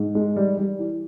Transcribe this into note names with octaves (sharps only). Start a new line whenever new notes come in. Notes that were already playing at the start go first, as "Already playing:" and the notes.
Already playing: G#2
G#3
G3
G3
E3